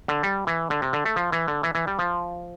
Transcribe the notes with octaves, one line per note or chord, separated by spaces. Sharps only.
D3
G3
E3
D3
C3
D3
A3
F3
E3
D3
E3
E3
G3
F3